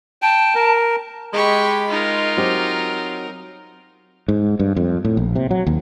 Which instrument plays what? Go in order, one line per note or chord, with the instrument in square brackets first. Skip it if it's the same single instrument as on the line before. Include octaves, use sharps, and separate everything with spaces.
[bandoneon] G5 [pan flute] A5
[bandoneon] A#4
[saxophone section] G#3 [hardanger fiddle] G4 B5 [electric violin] C#6
[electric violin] D#4 A#4 [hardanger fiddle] F4
[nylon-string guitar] F#3 C4 G4
[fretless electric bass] G#2
G2
F2
A2
A#1
C3
F#3
D#2